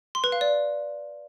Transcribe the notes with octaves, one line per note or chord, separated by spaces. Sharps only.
C6
B4
F5
D5